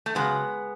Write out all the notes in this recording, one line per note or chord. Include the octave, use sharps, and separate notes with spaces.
A3
C#3 F#3 G#3 B3